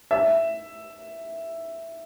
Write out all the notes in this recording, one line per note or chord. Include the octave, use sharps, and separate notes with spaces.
E5